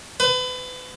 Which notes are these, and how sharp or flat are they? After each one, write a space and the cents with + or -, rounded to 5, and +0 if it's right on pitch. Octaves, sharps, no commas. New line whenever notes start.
B4 +35